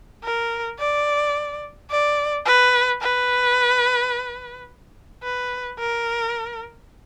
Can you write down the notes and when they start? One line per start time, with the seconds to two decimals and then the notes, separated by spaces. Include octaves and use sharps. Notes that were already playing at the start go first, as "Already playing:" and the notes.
0.24 A#4
0.79 D5
1.91 D5
2.46 B4
3.01 B4
5.23 B4
5.79 A#4